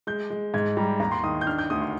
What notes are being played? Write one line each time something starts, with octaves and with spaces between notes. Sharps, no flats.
G#3 G6
G#3
G#2 G#6
G3 A#5
D#2 A#5
C6
D#3 D#6
G6
D4 F6
G6
D2 D#6
C6